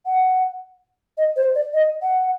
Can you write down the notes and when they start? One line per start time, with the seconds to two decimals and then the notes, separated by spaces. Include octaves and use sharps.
0.06 F#5
1.17 D#5
1.36 C5
1.55 D5
1.73 D#5
2.02 F#5